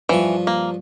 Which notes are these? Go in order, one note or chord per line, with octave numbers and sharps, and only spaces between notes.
G2 E3 F3 C#6
A#3